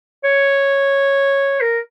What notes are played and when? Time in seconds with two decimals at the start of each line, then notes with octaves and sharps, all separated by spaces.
0.24 C#5
1.61 A#4